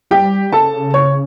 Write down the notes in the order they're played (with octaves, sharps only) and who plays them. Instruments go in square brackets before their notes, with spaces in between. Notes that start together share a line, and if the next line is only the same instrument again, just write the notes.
[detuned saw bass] G3 [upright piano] G4 G5
[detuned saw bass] C#3 [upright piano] A4 A5
[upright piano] C#5 C#6